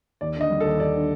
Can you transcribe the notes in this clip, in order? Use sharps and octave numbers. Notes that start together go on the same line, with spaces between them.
D#2 D5
D3 D#5
G3
A4
D#2
D#2 D5
D3